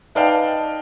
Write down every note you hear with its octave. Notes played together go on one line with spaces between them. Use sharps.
D#4 B4 D5 F5 G5 A5